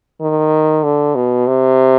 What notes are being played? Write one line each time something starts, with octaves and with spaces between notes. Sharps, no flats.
D#3
D3
B2
C3